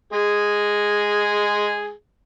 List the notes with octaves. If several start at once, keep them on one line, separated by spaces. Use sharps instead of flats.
G#3 G#4